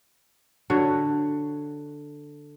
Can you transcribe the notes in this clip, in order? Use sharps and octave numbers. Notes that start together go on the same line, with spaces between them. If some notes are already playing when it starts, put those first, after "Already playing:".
D3 F#4 C#5